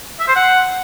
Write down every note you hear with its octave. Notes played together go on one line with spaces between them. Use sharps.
E5
C5
F#5